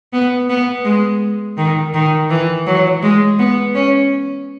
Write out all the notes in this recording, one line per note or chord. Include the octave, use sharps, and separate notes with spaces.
B3
B3
G#3
D#3
D#3
E3
F#3
G#3
B3
C#4